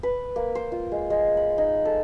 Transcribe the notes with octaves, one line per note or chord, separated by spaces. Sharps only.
B4
A#3
C5
F4
G#3
G#3
B5
D#4
A4